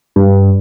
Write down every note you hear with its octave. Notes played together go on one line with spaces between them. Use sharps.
G2